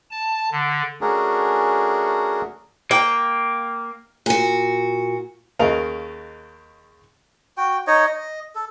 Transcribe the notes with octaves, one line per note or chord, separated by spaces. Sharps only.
A5
D3
A3 C#4 D4 F#4 G#4 A#4
A#3 G5
A#2 F#4
D#2 C#3 A#4 D#5 F5
F#4 G5
D#4 C#5 D#5
D#5
A4